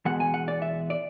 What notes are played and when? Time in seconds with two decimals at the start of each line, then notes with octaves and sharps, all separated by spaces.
0.05 E2 B2 G#3 F#5
0.20 G#5
0.34 F#5
0.48 D5
0.62 E5
0.90 D5